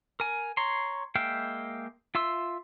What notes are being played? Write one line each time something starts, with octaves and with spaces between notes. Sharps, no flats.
A#4 G#5
C#5 A#5 C6
G#3 A#3 E5 F5 G5
F4 E5 C6 E6